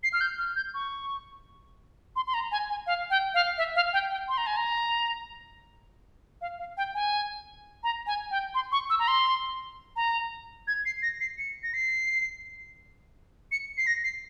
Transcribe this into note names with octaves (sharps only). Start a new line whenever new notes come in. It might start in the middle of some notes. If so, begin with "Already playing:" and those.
C7
F6
G6
F6
G6
C#6
C6
C6
A#5
G#5
G#5
F5
G5
F5
E5
F5
G5
G5
C6
A#5
G#5
A#5
F5
F5
G5
G#5
A#5
G#5
G5
C6
C#6
E6
A#5
C6
A#5
G#6
C7
A#6
C7
C#7
A#6
C7
C#7
C7
A#6
C7